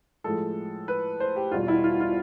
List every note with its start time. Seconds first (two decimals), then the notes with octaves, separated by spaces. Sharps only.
0.24 A2 F3 G#3 A4
0.88 B4
1.20 C5
1.36 G4
1.51 E2 B2 G3 F4
1.68 E4
1.84 F4
2.00 F4